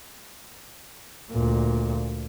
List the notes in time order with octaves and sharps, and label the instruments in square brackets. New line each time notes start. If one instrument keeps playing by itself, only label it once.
[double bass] D2 A#2